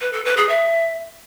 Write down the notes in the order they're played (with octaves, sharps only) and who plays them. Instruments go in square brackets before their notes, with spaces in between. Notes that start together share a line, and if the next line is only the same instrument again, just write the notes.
[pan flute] B4
A4
B4
G#4
E5